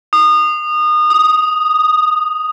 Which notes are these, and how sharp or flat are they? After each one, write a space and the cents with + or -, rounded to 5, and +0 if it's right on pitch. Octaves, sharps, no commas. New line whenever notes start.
D#6 -30
D#6 +0